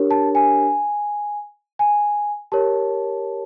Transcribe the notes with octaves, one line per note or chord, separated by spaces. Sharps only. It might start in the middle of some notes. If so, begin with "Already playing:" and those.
Already playing: D4 G4 A#4 C#5
A5
G#5
G#5
G4 A#4 C#5 A5